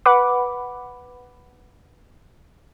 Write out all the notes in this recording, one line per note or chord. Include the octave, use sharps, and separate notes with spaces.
B4 F#5 B5 D6